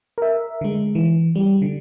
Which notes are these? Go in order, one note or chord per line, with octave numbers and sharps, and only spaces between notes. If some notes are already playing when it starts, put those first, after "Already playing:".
A#4 E5
D3 G#3
E3
G3
D3